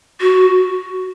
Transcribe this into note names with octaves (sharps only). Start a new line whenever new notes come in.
F#4